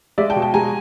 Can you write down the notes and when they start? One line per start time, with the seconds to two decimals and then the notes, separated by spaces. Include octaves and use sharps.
0.18 G#3 D5 E5
0.30 G5 A5
0.36 B2
0.42 G5 A5
0.54 G#3 G#5 A#5